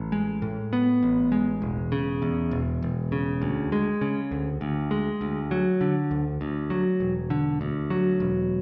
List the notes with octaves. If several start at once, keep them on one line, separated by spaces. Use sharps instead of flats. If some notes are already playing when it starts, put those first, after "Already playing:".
Already playing: A1
G#3
A2
B3
A1
G#3
E1
C#3
E2
E1
E1
C#3
D2
G#3
C#3
D2
D2
G#3
D2
F#3
D3
D2
D2
F#3
E1
D3
D2
F#3
E1